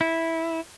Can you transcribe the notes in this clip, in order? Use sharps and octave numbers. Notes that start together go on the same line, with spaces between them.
E4